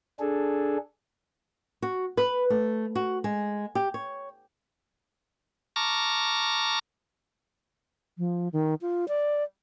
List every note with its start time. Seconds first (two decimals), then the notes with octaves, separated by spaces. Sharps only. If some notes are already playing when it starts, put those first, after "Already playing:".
0.19 D4 G#4 A4
1.82 F#4
2.17 B4
2.50 A3
2.95 F#4
3.24 G#3
3.75 G4
3.94 C#5
5.76 A5 A#5 C#6 D6 F6 A#6
8.18 F3
8.53 D#3
8.81 F4
9.08 D5